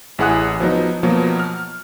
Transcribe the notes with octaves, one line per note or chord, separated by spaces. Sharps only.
A1 E4 G#4 F#5 D#6 F#6
F3 F#3 B3 D#4
B2 F3 F#3 A#3 B3
F6